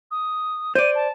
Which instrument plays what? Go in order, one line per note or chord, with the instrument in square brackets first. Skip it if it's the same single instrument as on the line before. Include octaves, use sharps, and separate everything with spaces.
[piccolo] D#6
[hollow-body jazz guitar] C5 D5 [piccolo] D#7
[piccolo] A5